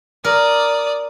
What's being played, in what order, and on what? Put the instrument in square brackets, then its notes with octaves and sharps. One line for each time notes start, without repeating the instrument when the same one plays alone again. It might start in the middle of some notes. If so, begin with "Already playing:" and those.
[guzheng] A#4 [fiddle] D5 D#6